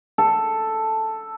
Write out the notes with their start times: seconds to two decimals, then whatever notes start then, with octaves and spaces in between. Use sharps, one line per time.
0.18 A4